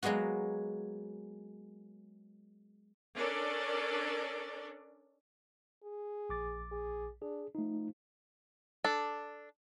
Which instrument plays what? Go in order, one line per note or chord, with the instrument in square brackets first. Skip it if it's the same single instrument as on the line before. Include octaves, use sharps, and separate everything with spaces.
[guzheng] F#3 G#3 A#3 B3 F#4
[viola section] C#4 D4 A4 A#4 D5
[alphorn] G#4
[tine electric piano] A#1 D6 A6
[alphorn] G#4
[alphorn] D4 [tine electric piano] G#4
[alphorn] F3 [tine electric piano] A3 D#4
[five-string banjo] D4 A4